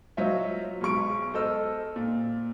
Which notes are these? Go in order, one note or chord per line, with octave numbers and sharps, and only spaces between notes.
F#3 F4 C5 C#5 D#5 E5
B1 G#3 C#6 D7
A4 C5 D#5 E6 F6
A#2